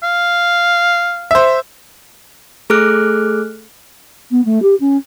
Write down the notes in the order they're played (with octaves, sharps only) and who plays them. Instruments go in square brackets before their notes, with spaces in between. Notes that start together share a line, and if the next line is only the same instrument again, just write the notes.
[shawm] F5
[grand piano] C5 E5
[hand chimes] A3 G#4 A4 D6 F6 F#6
[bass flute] B3
A3
G4
C#4